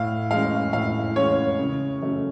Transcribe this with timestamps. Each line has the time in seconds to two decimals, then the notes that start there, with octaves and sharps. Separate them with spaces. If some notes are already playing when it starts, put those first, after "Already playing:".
Already playing: A2 F5
0.31 G#3 C#4 F5
0.73 A2 F5
1.16 G#3 C#4 C#5
1.59 C#3
2.01 F#3 A3 C#4